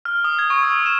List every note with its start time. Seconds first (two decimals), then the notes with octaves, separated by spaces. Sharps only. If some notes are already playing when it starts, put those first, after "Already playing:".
0.05 F6
0.24 D#6
0.39 G#6
0.50 C#6
0.63 E6
0.86 E7